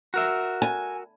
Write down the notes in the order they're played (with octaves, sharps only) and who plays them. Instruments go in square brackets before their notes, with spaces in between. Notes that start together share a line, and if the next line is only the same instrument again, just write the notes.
[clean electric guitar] F#4 A#4 E5
[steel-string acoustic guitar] G#5